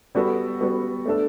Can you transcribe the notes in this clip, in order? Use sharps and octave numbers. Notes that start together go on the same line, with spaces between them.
G3 B3 F#4 A4
G3 B3 F#4 A4
A3 D4 A4